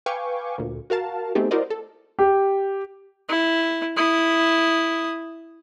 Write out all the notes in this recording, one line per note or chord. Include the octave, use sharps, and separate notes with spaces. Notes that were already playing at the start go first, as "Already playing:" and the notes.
B4 F5 G5 G#5 C#6 D6
D2 A#2
F#4 A#4 F5 A5
A3 B3 C4 D#4 G4 G#4
E4 F#4 A#4 C5 D5 D#5
A4
G4
E4
E4 D#6